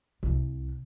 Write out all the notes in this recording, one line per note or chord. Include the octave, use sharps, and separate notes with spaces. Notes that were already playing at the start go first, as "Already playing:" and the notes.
C2